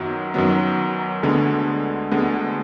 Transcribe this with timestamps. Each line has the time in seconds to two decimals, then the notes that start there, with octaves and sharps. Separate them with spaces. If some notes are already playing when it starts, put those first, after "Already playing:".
Already playing: F#2 D#3 F#3 B3
0.34 F#2 D#3 F#3 B3
1.23 D2 D3 G#3 B3
2.11 D2 D3 G#3 B3